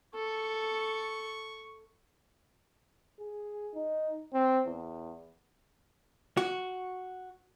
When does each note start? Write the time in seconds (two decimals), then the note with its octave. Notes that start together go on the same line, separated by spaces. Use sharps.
0.15 A4 C#6
3.20 G#4
3.74 D#4
4.33 C4
4.67 E2
6.37 F#4